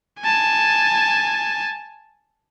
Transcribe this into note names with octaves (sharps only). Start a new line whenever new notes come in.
G#5 A5